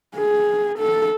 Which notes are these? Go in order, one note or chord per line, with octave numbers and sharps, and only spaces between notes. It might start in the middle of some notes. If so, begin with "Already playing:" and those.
G#4
A4